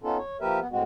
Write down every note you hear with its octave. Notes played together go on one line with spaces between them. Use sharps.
B3 C#4 D#4 F4 A4
C#5
F3 A#3 G4 A#4 B4 E5
B3
A2 G#3 C4 F#4